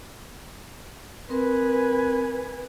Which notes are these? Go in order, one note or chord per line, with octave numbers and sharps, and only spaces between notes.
C4 A#4 B4 G#5